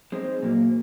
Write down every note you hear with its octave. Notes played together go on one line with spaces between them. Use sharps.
G#3 C4 D#4
A#2 F#3 A#3